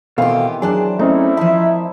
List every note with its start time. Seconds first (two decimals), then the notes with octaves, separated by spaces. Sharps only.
0.18 B2 D#3 E3 B3 C4 G4 A4 F5
0.62 F#3 D4 G#4 D5 A5
0.99 A3 C4 C#4 D#4 E4
1.37 F3 C5 E5 A5